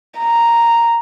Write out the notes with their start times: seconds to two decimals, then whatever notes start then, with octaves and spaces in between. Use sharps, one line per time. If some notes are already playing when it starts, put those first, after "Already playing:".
0.19 A#5